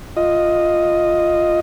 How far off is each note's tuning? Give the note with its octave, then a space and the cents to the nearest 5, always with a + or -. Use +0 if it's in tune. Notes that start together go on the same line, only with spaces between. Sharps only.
F4 +0 D#5 +0